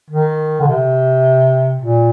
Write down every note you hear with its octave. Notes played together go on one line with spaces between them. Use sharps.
D#3
D3
C3
A#2